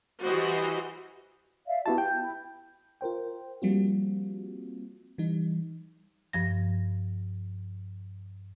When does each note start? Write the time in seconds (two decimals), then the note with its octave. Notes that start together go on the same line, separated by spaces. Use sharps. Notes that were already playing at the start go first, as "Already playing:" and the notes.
0.22 E3 G3 F#4 C5 D#5
1.67 D5 E5 F5
1.86 B3 E4 F#4 G4 A5
1.98 G5 G6
2.20 E4
3.01 F4 A#4 C5 G5
3.62 F3 G3 A#3 C4 F4 F#4
5.18 E3 G3 D#4
6.33 G2 F3 A#6